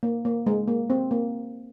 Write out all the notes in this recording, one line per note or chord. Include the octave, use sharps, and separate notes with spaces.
A#3
A#3
G#3
A#3
C4
A#3